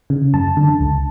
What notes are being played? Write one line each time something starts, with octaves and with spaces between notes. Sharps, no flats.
C#3
F#2 A5
D3
C#2